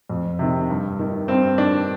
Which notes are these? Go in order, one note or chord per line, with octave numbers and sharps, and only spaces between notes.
F2
C3 D#3
G2
D#3
G2 C4
D#3 D4